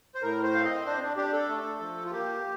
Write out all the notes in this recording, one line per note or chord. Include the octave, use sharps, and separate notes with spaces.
C5
A2 A#4
C5
C4 F5
D#5
D4 C5
D4
D4 G4
A4
A3
F3
F4
A#3 G4